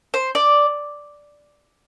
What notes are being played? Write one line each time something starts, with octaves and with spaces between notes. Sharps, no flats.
C5
D5